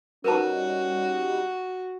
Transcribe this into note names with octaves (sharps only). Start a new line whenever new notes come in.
G3 C#4 D#4 F#4 A#4 B4 A5